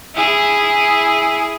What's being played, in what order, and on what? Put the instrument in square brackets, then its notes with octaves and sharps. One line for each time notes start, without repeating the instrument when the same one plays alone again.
[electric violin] E4 G#4